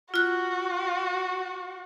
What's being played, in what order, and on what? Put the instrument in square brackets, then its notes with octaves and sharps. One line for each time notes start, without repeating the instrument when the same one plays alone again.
[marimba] F4 F#6 [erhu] F#4